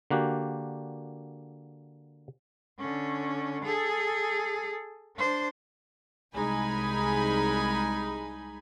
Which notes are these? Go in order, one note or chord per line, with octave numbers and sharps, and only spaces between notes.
D3 A#3 F#4 G4
D3 C#4
G#4 A4
D4 C5
C2 G#3 D#4 G#5 B5